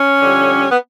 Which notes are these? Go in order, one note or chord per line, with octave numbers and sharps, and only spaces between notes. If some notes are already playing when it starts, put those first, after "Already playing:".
Already playing: C#4
F2 D3 G3
B3